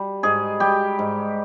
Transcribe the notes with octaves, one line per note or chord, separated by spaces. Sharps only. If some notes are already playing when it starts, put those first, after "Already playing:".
Already playing: G3
G#2 G#4
G3 G4
G#2